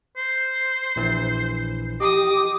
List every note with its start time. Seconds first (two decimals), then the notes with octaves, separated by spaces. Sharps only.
0.17 C5
0.96 A#1 E3
2.00 G4 D#5 D6 D#6